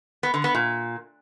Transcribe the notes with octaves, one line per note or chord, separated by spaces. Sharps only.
B3
D3
B3
A#2